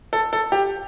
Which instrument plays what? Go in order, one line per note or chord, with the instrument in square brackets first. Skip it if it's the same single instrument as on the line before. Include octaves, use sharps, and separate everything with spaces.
[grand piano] A4
A4
G4